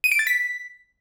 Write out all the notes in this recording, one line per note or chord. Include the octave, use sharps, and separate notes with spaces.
D#7
D7
A6
B6